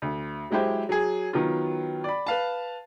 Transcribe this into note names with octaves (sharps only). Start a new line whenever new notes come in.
D2
F#3 G#3 E4 G4 C5
F#3 G#4
D#3 F#3 B3 F4
D5 B5
B4 F5 A5